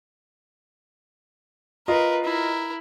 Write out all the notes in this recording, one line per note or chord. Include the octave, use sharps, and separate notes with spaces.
F4 A#4 B4 D#5
E4 A#4